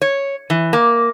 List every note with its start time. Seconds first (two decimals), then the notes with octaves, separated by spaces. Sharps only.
0.02 C#5
0.50 E3
0.73 A#3